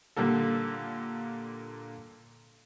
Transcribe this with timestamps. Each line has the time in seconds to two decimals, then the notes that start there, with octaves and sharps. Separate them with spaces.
0.16 A#2 D3 G3 A#3 A4